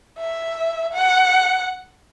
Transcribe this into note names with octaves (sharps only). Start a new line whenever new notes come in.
E5
F#5